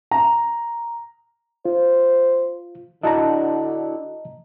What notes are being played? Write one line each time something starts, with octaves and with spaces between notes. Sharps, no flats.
A#5
F4 C5
D3 D4 E4 F#4 D#5 A5 A#5